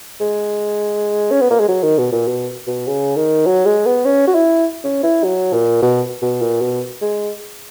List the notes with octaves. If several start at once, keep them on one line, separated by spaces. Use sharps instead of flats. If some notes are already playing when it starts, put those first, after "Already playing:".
G#3
C#4
B3
A#3
G#3
F#3
D#3
B2
A#2
B2
B2
C#3
D#3
F#3
G#3
B3
C#4
F#4
E4
C#4
E4
F#3
A#2
B2
B2
A#2
B2
G#3